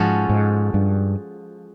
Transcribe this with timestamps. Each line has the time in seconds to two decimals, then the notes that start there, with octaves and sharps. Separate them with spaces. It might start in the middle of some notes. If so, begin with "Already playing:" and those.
Already playing: G#2 F3 G#3 C#4 F#4 A4
0.30 G#2
0.74 G2